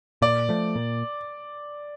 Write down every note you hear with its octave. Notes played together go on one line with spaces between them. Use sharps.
A#2 D5
F3 A3
A#2